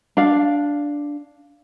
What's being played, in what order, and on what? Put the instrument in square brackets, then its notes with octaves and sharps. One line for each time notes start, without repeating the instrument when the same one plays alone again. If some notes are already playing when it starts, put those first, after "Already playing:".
[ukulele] D4 F5